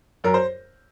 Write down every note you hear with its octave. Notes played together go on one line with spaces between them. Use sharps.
F#2 A#4
C5